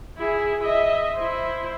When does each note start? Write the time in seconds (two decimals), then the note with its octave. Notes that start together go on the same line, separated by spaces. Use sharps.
0.18 E4 G#4
0.62 D#5 E5
1.15 E4 C5